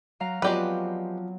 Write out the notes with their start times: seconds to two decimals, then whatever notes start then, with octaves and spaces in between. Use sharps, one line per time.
0.20 F#3 F5 A#5
0.42 F3 F#3 G#3 B3 C4 G4 B4 D5